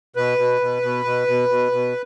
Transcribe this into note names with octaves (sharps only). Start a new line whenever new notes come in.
B2 B4
B2
B2
B2
B2
B2
B2
B2